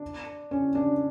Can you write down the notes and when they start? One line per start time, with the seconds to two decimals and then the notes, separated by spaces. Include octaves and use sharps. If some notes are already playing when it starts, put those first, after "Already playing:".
Already playing: D4
0.51 C#4
0.75 D4